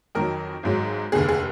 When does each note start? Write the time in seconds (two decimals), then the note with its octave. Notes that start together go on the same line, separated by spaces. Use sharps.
0.15 F2 D#3 F#3 A#4
0.63 G#1 G#2 F#3
1.12 F1 D#2 D3 G#4
1.28 G#4